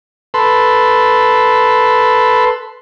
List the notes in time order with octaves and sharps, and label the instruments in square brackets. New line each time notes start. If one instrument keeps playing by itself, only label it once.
[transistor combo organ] A4 B4 C6